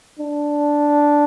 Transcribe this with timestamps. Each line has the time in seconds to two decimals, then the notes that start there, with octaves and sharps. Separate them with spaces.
0.19 D4